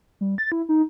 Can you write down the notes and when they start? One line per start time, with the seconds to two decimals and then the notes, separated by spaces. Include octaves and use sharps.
0.21 G3
0.38 A6
0.52 E4
0.69 D#4